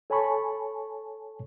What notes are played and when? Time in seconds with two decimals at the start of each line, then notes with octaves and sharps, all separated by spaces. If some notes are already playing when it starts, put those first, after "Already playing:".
0.10 A4 C#5 G#5 A5 B5 C#6